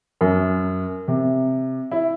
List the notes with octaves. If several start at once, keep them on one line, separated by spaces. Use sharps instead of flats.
F#2
C3
E4